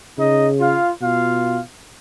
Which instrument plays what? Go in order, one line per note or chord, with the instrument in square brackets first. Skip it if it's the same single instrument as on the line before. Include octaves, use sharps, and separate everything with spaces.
[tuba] C#3 [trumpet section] D#4 D#5
[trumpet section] F4 F5
[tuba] B2 [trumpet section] F4 F5